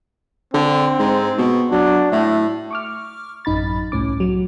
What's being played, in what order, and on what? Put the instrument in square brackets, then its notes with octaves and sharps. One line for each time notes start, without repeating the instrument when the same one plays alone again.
[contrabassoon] D3 [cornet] C4
[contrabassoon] G#2
B2
[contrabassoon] F#3 [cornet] D4
[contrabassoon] A2 [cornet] E5
[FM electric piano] C#6 D6 F6
A1 F#2 D#4 B5 A6
C2 A2 C#4 D6
F#3